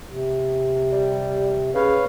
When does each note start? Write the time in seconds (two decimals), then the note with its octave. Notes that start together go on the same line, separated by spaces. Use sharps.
0.10 C3
0.92 G3
1.75 C#3 B4 C#5 F5